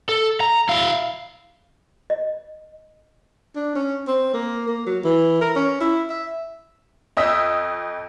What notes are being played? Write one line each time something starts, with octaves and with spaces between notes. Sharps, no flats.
A4
A#5
E4 F5
D#5
D4
C#4
C4
A#3
A#3
F#3
E3
A#4
C#4
E4
E5
F2 D#5 D#6 E6 B6